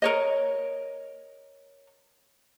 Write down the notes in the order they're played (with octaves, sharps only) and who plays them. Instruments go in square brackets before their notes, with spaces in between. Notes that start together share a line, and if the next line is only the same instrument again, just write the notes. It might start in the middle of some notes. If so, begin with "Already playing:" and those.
[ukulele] A#4 C#5 D#5